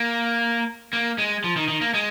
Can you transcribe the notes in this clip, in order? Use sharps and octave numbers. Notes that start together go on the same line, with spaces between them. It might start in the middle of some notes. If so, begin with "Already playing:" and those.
Already playing: A#3
A#3
G#3
F3
D#3
D#3
A#3
G#3